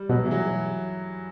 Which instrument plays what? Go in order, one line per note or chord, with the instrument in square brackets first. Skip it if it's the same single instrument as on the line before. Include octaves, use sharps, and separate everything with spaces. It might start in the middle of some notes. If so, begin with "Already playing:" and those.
Already playing: [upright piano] G3
[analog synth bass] B2 [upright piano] F#3
[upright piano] E3
F#3